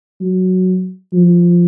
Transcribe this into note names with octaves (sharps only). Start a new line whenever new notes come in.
F#3
F3